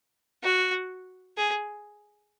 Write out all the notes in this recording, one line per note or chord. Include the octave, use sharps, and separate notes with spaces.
F#4
G#4